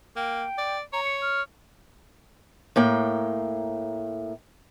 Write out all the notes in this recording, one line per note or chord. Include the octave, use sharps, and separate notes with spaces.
A#3 G5
D5
C#5 A#5
C#7
F6
A2 A#3 G5